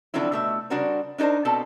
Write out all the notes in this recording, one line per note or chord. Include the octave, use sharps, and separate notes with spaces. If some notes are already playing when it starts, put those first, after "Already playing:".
D3 F3 F#3 C4 E4
B2 A3 E5
C#3 G3 D4 F#4 A#4 C5
D4 D#4 A4 A#4 C5
B2 C4 A4 A5